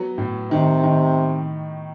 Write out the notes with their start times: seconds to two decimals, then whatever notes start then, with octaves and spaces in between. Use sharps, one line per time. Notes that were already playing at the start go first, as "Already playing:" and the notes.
Already playing: F#3 B3
0.18 A2
0.51 C3 D#3
0.83 D#3